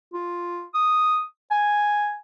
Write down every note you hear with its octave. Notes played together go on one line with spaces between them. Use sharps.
F4
D#6
G#5